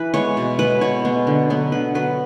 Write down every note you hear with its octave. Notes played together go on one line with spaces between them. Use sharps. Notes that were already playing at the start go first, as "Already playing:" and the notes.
Already playing: E3 B4
G#3 B3 C#5
B2
G#3 B3 B4
B2 C#5
G#3 B3
D3
F#3 B3
D3 B4
F#3 B3 B4